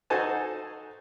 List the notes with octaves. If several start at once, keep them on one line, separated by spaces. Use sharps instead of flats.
D#4 F#4 A4 C5 G#5 A5